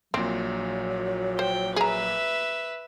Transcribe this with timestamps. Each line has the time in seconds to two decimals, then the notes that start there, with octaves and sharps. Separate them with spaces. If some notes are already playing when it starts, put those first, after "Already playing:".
0.14 A#1 A#2 F#3 C4
1.39 C5 G5
1.76 G#4 B4 E5 A#5